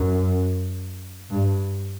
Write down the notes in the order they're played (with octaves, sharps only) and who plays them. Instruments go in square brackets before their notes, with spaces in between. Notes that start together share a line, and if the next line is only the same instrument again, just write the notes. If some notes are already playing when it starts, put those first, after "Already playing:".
Already playing: [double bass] F#2
G2